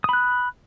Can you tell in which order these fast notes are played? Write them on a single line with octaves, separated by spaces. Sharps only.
D#6 B5 F#6